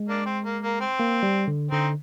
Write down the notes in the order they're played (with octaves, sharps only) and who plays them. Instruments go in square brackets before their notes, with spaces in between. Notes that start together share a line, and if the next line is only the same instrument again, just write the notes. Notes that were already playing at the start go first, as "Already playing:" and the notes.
Already playing: [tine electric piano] G#3
[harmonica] A#3 D4
C4
A#3
A#3
C4
[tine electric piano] A#3
G3
D3
[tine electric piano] D3 [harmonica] C4 D#4